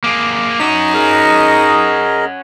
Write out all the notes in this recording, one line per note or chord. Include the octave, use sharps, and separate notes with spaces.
A#3 G#4 D6
C#4 D#4 F#4
G#4 A#4 D#5